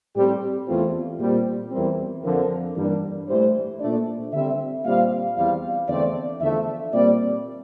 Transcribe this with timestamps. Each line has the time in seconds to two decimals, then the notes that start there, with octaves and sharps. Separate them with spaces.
0.15 A2 G3 C4 G4
0.67 E2 E3 A3 C4 F4
1.20 A#2 G3 C4 G4
1.71 E2 E3 G3 C4 A#4
2.24 F2 D3 F3 A#4
2.76 G2 E3 G3 A#3 D4
3.28 A2 E3 G3 C5
3.80 A#2 A3 D4 D5
4.32 D3 G3 C4 E5
4.85 A#2 G3 C4 F5
5.36 E2 E3 G3 C4 F5
5.89 E2 D3 A3 C4 D5
6.41 E2 D3 F3 A3 E5
6.93 A#2 G3 C4 D5